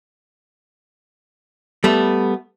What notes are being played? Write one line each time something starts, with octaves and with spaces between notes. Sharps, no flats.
G3 A3 B3